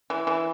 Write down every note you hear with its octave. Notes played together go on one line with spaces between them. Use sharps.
E3
E3